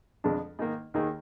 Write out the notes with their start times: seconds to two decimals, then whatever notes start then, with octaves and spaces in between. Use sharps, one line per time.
0.24 F2 D3 G#3 D4
0.59 G#2 D#3 A#3
0.94 D#2 D#3 A#3 D#4 G#4